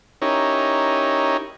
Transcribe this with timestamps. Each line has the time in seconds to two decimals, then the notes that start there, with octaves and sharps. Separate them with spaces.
0.22 C#4 D#4 E4 G4 A#4 C#5